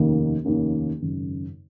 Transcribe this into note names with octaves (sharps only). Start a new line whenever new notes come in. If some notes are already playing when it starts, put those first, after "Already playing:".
Already playing: F1 D#2 D#3 A#3 C#4
F1 D#2 D#3 A#3 C#4
G#1 F#2 C#3